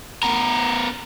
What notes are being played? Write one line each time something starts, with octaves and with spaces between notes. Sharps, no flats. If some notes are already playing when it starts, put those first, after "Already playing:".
B3 A#4